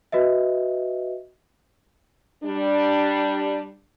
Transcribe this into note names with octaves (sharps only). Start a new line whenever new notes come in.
F#4 B4 D#5 E5
G3 D4